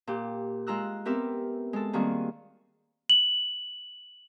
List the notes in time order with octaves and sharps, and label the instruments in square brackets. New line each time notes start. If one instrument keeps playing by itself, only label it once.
[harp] A#2 G4
G#3 F4 A#5 E6 F#6
B3 C4 G4 A#4 E5
G#3 A4
D#3 G3 A#3 C4 F#4 G#4
[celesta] F#7